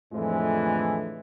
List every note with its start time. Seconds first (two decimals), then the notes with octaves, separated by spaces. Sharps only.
0.13 F2 A2 D3 E3 F3 G#3